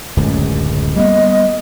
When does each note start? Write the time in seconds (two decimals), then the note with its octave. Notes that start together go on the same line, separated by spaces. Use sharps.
0.17 D1 C#2 F#2
0.96 G3 A#3 B3 D#5